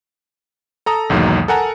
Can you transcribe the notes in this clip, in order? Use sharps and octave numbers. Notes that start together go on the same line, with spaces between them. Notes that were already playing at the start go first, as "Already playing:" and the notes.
A4 A#5 D#6
B1 E2 G#2 D#3 F#3 A#3
A4 A#4 F#5 G#5 A#5